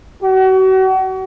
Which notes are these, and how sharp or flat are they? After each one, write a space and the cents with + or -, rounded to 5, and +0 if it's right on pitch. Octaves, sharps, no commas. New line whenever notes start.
F#4 +35